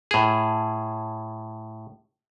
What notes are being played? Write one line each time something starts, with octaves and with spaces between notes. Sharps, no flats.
A2 G#4